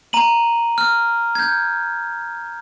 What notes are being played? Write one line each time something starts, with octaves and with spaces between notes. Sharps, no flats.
A#5 D#7 F#7
F6
G6 G#6